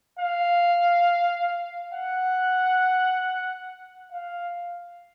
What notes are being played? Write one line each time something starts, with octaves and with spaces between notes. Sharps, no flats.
F5
F#5
F5